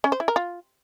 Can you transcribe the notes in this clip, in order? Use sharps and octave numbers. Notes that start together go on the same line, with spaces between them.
C#4
C5
E4
A#4
F4